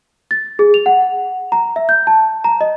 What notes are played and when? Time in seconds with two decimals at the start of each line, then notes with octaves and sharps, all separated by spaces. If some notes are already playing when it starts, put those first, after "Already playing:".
0.31 A6
0.59 G#4
0.74 F7
0.86 F#5
1.52 A#5
1.76 E5
1.89 G6
2.07 A5
2.44 A#5
2.61 D#5